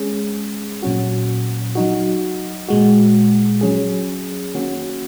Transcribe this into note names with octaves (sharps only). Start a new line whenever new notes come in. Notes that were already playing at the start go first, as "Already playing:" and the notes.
Already playing: G#3 C#4 G#4
A#2 F#3 C#4 F#4
F#3 D#4 F#4
A#2 G#3 F#4
F#3 C#4 G#4
D#3 A#3 C#4 F#4